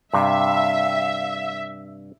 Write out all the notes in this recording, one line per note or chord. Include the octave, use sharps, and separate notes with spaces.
G2 C3 E5 F5